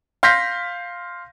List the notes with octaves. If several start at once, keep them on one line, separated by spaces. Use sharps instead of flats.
F5 C6 G6 A#6 B6